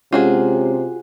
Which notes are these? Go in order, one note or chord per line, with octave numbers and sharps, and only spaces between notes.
C3 G#3 C#4 F4 F#4 G#4